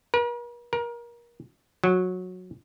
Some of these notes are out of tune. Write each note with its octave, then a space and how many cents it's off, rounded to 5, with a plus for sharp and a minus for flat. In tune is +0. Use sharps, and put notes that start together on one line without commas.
A#4 +45
A#4 +25
F#3 -15